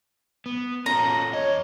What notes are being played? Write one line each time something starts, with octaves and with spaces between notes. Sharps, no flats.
B3
C#4 F4 A4 A#5
E2 C#5 D#5